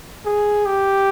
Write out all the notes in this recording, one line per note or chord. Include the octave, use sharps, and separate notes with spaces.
G#4
G4